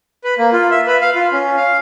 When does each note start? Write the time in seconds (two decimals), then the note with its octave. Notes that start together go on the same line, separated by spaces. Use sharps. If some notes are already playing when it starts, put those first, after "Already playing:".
0.24 B4
0.38 A#3
0.53 F4
0.71 E5
0.87 B4
1.01 F5
1.15 F4
1.32 C#4
1.57 F5